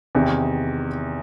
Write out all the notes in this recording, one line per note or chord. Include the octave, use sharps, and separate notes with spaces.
E2 C3 D#3